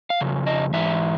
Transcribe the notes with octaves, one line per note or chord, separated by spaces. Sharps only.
F5
F2 C#3
D#5
G#2 E3 E5